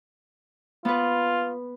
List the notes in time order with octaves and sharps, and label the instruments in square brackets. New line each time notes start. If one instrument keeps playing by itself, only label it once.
[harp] B3 B4 [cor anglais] F4